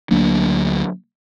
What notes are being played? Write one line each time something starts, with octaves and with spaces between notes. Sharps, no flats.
D2 F#3 A#3 D4